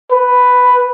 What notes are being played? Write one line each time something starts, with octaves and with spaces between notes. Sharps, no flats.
B4